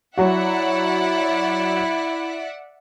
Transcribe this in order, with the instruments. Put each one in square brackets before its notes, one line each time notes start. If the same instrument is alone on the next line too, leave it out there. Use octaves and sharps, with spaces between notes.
[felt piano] F#3 F#4 [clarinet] E4 [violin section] D5 E5 F#5